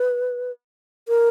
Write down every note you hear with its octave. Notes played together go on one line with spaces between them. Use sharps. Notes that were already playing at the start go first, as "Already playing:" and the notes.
Already playing: B4
A#4